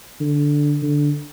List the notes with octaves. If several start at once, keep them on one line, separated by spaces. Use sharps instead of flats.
D3
D3